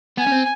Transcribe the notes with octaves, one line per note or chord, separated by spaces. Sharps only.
B3 G#5
C#4
C4